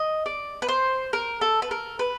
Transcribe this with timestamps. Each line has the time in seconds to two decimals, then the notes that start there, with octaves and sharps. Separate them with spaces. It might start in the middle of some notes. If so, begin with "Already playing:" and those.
Already playing: D#5
0.26 D5
0.62 B4
0.69 C5
1.13 A#4
1.41 A4
1.62 B4
1.71 A#4
1.99 B4